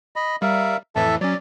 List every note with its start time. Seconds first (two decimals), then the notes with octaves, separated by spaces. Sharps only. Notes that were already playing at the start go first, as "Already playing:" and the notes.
0.16 D#5 B5
0.42 G3 A#4 E5 F5
0.96 F2 A2 E3 A4 E5 A5
1.21 F#3 C#4 D5